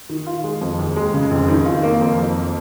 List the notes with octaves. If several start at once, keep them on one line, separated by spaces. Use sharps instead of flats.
D#3
F4
G#3
F2
D#2
G#3
C#3
F1
D#3
F4
A#3
F2
F2